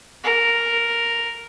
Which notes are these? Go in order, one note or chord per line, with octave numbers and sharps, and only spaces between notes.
A#4